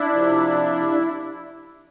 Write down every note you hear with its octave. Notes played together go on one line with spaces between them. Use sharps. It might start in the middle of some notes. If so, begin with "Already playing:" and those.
Already playing: D4 E4
C3 F3
D4